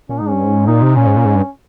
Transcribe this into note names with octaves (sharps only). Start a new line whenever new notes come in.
A#2 C#4
G#2 D#4
G2 C#4
G#2
A#2 D#4
C3
A#2 C#4
G#2
A#2
G#2
G2